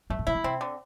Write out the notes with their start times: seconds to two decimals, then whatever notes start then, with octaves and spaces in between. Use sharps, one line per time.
0.10 G2 A3
0.19 A2
0.27 C3 E4
0.35 D3
0.44 C3 C4
0.61 D3